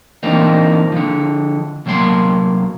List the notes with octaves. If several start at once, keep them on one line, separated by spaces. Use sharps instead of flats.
E3 F3 A#3 C4 D4 D#4
D3 F3
C2 F#3 A#3 D#5 C6